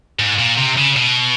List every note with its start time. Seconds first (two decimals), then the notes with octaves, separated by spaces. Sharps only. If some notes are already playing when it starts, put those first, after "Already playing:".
0.19 G#2
0.39 A#2
0.58 C3
0.78 C#3
0.96 B2